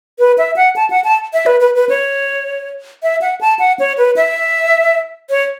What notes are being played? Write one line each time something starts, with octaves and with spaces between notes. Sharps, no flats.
B4
E5
F#5
A5
F#5
A5
E5
B4
B4
B4
C#5
E5
F#5
A5
F#5
C#5
B4
E5
C#5